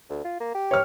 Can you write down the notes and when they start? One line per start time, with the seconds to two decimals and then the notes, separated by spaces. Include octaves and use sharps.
0.10 D2
0.25 F4
0.40 A#3
0.55 G4
0.71 C#5 F6